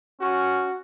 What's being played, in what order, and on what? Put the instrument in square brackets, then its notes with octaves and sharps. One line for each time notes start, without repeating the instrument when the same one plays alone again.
[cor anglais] C#4 [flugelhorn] F#4